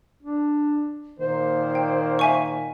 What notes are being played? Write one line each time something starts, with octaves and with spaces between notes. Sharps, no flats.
D4
A#2 D#3 A#3 C5
G5
E5 G#5 C#6